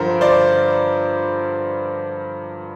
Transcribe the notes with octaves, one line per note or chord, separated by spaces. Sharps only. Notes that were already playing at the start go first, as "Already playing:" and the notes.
Already playing: G2 D3 F3 A#4 C5
C5 D5